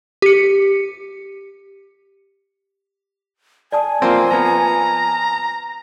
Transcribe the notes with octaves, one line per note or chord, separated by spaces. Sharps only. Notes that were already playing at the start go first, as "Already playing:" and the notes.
G4 C#7
D5 G#5 A5 D#6
F3 A#3 C4
F3 B3 A#5